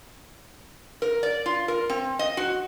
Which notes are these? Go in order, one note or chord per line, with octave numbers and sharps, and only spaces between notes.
A#4
D5
F4
A#4
C4
D#5
F#4